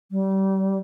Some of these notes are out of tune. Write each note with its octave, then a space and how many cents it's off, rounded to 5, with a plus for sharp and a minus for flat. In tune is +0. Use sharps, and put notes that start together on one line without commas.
G3 -30